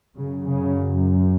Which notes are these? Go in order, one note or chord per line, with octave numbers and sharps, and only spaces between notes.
F#2 C#3
C#3